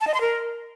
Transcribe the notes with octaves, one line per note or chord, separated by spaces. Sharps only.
A5
D#5
C6
A#4